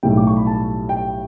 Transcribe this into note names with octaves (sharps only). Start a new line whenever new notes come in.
B1 A2 G3 G5
D6
C#6
B5
A5
G5